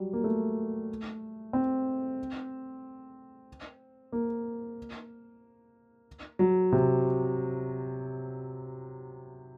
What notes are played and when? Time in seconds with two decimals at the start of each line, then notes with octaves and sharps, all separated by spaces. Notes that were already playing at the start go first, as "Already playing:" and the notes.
Already playing: F#3 G3
0.13 A#3
0.24 A3
1.53 C4
4.12 A#3
6.39 F#3
6.72 C3